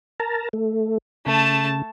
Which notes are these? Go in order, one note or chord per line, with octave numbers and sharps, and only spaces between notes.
A#4 A5 A#5
A3
C#3 A3 A5